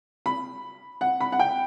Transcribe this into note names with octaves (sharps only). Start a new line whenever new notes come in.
B5
F#5
B5
F#5
G5